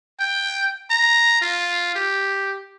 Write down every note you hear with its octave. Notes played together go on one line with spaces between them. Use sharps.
G5
A#5
F4
G4